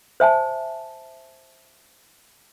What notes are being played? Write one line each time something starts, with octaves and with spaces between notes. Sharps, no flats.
C5 E5 G#5 A5